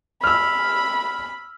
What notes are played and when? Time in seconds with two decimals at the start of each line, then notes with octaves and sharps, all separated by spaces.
0.24 B5 E6 F6